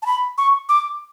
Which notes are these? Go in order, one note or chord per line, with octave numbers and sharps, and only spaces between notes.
A5
B5
C#6
D6